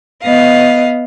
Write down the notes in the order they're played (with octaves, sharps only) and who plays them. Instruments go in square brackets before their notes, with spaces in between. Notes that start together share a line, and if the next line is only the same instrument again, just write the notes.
[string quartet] B3 D#5 F5